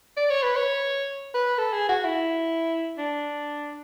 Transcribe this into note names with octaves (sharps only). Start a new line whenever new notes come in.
D5
C#5
B4
C#5
B4
A4
G#4
F#4
E4
D4